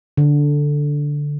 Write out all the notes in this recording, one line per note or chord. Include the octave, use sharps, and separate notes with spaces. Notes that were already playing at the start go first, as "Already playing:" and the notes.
D3